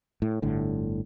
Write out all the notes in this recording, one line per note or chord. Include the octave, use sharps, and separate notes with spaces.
A2
G1 A2 D3